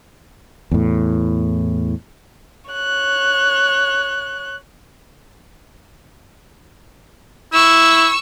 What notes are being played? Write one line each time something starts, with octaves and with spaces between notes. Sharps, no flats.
E2 A2
C#5 F#6
E4 C#6 E6